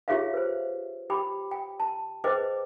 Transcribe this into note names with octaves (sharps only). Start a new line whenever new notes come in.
F4 G4 G#4 C#5 E5 F5
B4 C5
G4 G5 B5 D6
G5
A5
G#4 B4 C5 D#5 G5 D6